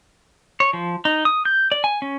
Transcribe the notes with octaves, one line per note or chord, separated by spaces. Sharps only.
C#5
F3
D#4
D#6
G6
D5
G#5
C#4